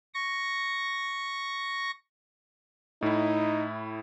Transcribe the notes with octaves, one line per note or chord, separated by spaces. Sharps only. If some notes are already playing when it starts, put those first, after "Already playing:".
C#6 A#6
A2 D#4 E4